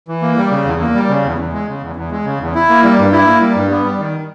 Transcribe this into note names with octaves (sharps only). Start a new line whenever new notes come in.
E3
A#3
G3
C#3
E2
A#3
G3
C#3
E2
E2
G#3
C#3
E2
E2
G#3
C#3
E2
E4
A#3
G3
G2
E4
A#3
G3
G2
B3
G3
D#3